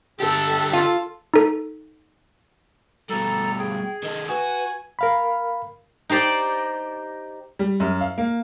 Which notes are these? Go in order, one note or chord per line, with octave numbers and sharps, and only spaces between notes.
D3 G4 A4
F4
D#4 A4
G2 B2 A4 A#5
G#4 G5
D#3 A4 D#5
F#4 B4 G#5
A#4 F5 B5
D#4 G4 C5 D5
G3
F#2
F5
A#3